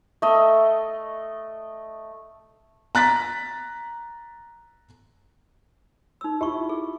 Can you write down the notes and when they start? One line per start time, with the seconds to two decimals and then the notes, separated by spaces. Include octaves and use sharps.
0.22 A3 D#5
2.95 A#5 F#6 A6 B6
6.21 D#4 E6
6.41 E4 F4 G4 C#6
6.69 G#4